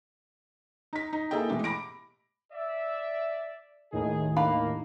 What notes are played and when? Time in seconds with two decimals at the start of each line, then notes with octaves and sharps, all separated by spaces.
0.93 D#4 B6
1.13 D#4
1.31 A#3 E4 G#4 A4 D#5 G5
1.50 B2 E3 G#3 A3 G4
1.64 B5 D6 A#6 D7
2.53 D5 E5
3.92 D#2 A2 D#3 G#4
4.36 A#3 D4 F5 B5